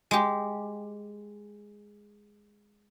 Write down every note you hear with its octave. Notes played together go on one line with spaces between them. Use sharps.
G#3 G4